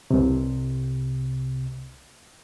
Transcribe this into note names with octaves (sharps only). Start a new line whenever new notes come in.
C2 C3